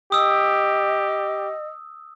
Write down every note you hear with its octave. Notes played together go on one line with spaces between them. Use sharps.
G4 D#5 D#6 E6